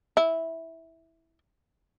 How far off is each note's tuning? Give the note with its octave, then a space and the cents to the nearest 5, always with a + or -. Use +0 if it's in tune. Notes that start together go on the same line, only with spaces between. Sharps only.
E4 -10